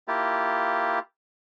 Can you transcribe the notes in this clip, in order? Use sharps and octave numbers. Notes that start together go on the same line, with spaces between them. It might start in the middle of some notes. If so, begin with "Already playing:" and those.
A#3 E4 F4 G4